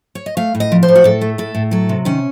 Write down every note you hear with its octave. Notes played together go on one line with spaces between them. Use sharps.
C#5
D#5
A3 F5
A2
D#5
F3
C5
A2
F#4
A2 A4
A3
A2 A4
A2
F#3 A4
C3
D#3 C#4